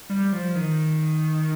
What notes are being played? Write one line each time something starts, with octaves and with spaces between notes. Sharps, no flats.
G3
F3
D#3